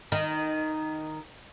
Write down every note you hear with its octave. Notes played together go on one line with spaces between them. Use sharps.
D#3